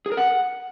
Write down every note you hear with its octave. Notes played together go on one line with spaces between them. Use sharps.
G#4
A#4
F#5